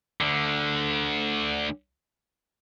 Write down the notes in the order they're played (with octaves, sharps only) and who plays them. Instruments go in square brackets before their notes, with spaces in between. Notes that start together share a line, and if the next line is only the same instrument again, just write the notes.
[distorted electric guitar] D2 D3